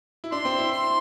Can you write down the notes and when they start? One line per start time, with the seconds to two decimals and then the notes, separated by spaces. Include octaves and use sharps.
0.24 E4
0.32 D4 C6
0.45 C4
0.58 E4
0.72 C6